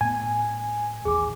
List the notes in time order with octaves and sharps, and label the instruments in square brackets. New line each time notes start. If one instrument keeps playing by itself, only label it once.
[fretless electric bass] A2 A3 B3 [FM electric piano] G#5
[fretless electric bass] A1 D#2 [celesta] G#4 D6